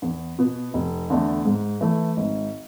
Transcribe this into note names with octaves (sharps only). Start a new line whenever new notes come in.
E2
B2 B3
F1
E2 D3 A3
G#2
E3 A3
G#1